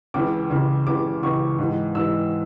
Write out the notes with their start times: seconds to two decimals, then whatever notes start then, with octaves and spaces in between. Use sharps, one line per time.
0.14 C#2 C#3 E3 D6
0.50 C#2 C#3 E3
0.87 C#2 C#3 E3 D6
1.23 C#2 C#3 E3 C#6
1.59 G#2 E3
1.95 G#2 E3 E6